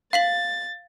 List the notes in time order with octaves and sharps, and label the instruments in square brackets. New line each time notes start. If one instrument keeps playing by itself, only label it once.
[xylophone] F5 B6 F#7 [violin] A6